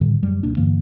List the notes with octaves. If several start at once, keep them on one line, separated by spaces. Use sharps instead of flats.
A2 D3 D#3 G3
F#2 F#3 G3 A3
D1 B2 A#3 D4
G2 D3 E3 A#3